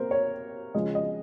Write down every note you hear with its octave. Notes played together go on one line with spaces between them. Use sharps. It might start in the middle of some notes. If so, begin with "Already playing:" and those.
Already playing: C3 A#3 A#4 C5
C#5
C#3 F3 G#3 D#5
D#5